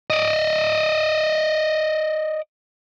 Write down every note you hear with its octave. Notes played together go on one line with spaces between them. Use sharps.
D5 D#5